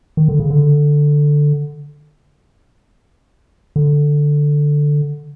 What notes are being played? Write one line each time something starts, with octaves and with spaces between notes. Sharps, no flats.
D#3
D3
C#3
D3
D3